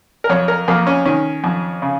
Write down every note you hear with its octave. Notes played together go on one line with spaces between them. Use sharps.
A#4
F2 C#5
A#4
F2 A#3
C#4
D#3 C#4
F2
C#3